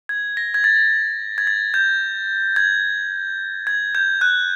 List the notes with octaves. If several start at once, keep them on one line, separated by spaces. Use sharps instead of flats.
G#6
A#6
G#6
A6
G#6
A6
G6
G#6
G#6
G6
F#6